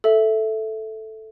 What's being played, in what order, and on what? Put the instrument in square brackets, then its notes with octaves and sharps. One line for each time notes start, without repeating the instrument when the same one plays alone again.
[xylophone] A4 E5